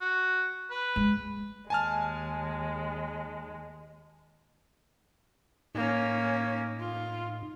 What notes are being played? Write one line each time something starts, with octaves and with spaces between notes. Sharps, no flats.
F#4
B4
G#3
D#2 G#3 G#5 A5 F6
A2 A#3 C#4 D#4
F4